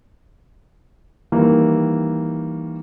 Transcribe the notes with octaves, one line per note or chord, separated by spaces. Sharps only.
D#3 E3 G3 A#3